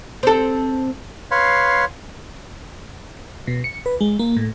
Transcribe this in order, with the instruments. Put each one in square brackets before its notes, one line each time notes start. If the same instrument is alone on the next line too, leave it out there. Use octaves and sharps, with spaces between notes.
[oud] C4 A4
[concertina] B4 C#5 F5 C6
[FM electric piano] B2
C#7
B4
G#3
A#3
A2